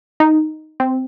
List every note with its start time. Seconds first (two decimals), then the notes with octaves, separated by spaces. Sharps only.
0.20 D#4
0.80 C4